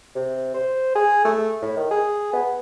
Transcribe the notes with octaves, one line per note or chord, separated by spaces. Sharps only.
C3
C5
G#4
A3
A2
D#3
G#4
B3